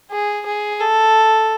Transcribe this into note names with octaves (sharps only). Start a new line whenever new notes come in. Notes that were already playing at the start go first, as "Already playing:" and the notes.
G#4
G#4
A4